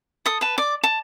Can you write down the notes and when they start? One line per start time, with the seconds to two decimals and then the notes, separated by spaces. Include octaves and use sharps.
0.26 A4 D#6
0.41 B4 A5
0.58 D5 D6
0.84 A5